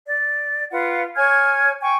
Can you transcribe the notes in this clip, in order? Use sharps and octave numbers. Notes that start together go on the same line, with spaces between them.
D5
F4 B4 F#5
C#5 G#5 F6 G#6
G5 G#5 C#6